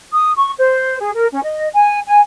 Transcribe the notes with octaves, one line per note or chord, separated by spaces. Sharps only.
D#6
C#6
C5
G#4
A#4
C#4
D#5
G#5
G#5